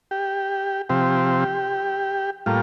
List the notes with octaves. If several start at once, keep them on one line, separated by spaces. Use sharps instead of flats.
G4
C3 F3 C4 G4
A2 G3 A#3 F4